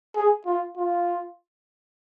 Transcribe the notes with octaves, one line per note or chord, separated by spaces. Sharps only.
G#4
F4
F4